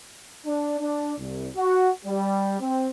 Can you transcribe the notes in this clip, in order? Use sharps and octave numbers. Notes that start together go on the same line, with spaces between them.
D4
D4
C2
F#4
G3
C4